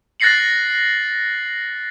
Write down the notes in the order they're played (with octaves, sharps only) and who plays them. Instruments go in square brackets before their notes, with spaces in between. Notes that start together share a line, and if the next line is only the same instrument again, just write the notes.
[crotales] F#6 A6 A#6 C7 C#7 F#7